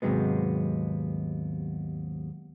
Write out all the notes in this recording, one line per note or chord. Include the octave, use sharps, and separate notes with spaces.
D#2 G#2 C3 F#3 G#3 B3